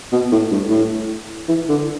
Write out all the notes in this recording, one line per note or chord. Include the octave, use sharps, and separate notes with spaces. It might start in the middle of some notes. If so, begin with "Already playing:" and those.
B2
A2
G2
A2
E3
D3